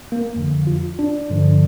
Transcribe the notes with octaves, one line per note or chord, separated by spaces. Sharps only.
A#3
F2 D3 F3
F4
D4
G2 D3 F3